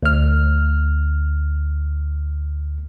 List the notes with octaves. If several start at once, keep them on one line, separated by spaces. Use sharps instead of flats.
D2 F6